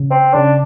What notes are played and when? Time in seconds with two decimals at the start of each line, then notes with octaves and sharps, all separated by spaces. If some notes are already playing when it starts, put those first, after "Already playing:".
Already playing: C#3
0.11 C4
0.34 C#3 D4